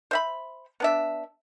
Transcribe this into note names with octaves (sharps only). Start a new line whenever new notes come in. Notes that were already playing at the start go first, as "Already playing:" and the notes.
C5 E5 B5
B3 D4 E5